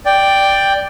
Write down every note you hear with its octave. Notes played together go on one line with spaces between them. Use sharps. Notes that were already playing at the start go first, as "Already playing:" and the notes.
D5 G5